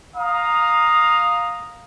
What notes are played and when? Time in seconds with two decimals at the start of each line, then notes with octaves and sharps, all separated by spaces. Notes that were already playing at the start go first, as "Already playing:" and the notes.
0.16 F5 A#5 D#6